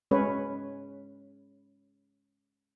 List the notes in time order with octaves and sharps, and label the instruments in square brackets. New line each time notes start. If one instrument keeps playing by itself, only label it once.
[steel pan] G#3 C#4 B4 C#5